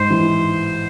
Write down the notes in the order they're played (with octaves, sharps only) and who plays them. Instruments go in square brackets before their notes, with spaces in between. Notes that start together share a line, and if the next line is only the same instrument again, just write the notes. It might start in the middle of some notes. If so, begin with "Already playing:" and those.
Already playing: [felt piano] G#2 [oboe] C5
[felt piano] E3